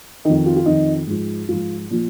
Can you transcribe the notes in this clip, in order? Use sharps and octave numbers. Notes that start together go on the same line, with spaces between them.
F2 D#3 D#4
F4
F4
F2 D#3 D#4
G#2 F3
G#2 F3 F4
A#2 F3